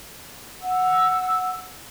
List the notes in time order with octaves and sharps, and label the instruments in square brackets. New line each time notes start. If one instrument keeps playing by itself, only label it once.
[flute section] F#5 E6